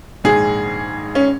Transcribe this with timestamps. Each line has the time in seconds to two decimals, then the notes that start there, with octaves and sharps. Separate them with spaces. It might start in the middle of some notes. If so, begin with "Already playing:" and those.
0.24 A#1 G#2 D#3 G#4
1.15 C#4